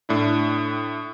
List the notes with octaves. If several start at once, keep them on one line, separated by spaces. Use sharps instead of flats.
A2 D4 E4